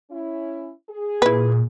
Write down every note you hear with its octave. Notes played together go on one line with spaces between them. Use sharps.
C#4 E4
G#4
A#2 E4 B4